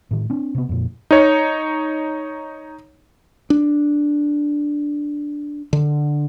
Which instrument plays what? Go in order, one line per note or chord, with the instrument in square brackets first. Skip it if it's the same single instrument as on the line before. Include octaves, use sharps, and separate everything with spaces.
[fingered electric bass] A2 D#3
C4 D4
C3 B3
F2 A#2
[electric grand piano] D#4 C#5
[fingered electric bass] D4
D3